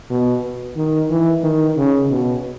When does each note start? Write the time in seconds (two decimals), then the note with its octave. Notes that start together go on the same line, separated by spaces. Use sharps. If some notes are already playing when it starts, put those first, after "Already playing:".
0.10 B2
0.77 D#3
1.10 E3
1.43 D#3
1.77 C#3
2.10 B2